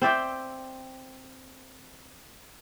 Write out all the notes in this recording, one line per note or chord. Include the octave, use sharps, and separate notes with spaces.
C4 D5 E5 G5